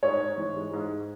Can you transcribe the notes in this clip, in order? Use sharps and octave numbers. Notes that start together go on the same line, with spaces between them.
G#2 C#5
G#2
E3
G#3
G#2